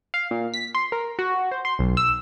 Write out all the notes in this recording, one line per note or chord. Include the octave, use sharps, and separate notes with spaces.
F5
A#2
B6
C6
A#4
F#4
C5
C6
B1
E6